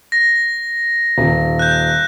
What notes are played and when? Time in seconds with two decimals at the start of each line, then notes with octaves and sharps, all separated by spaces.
0.12 A#6
1.18 D#1
1.59 F#6 G6